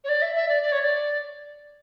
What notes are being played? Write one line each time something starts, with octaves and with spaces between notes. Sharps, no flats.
C#5
D5
E5
E5
D5
D5
C#5
D5